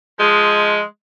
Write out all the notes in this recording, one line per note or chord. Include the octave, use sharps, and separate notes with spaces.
F3 G#3